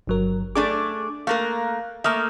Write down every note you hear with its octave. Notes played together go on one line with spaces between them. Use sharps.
G1 F#3 A#4
A3 D4 G#4 D6
A3 A#3 A#4 F5 F#6
A3 A#3 E5 D#6 F6